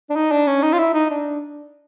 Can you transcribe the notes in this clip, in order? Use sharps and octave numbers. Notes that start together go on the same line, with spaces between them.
D4
D#4
D4
C#4
D#4
F4
E4
D#4
D4